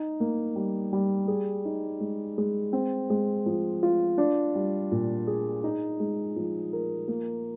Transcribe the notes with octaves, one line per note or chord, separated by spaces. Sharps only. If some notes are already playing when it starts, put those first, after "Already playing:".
Already playing: D#4
A#3
G3
G3
G#4
D#4
G#3
G#3
C4
G#3
F3
F4
D4
G3
A#2
G#4
D#4
G#3
F3
A#4
A#3